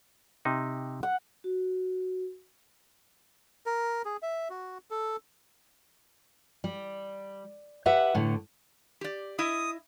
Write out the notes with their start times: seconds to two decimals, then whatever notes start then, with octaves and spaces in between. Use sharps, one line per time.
0.45 C3 D#4
1.03 F#5
1.44 F#4
3.66 A#4
4.05 G#4
4.22 E5
4.50 F#4
4.91 A4
6.64 G3
7.86 G4 B4 E5 F#5
8.15 A2 D3
9.01 G4 D5
9.39 E4 D#5 E5 D#6